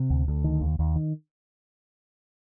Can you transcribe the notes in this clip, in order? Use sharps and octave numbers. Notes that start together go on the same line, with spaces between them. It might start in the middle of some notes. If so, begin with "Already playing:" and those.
Already playing: C3
D2
D2
D#3
D#2
D#2
D#3